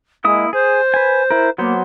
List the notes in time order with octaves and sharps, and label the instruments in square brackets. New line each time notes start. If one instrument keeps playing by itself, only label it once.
[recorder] G#3 [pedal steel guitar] A#3 E4 D#6
[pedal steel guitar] G#4 [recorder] C5
[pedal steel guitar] B4 G#5
E4 A#4
[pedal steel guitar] F#3 B3 C5 [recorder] A#3